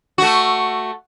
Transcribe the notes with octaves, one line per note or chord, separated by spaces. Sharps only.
A3 F#4